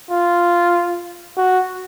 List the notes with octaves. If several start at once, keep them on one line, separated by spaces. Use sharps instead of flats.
F4
F#4